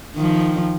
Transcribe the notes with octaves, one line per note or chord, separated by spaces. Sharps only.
D#3 F3